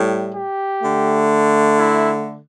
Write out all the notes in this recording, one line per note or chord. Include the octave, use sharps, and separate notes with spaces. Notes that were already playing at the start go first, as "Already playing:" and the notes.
Already playing: A2 G3
G4
D3 A3
E4